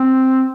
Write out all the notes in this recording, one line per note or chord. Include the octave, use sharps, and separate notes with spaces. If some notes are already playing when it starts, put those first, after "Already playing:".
Already playing: C4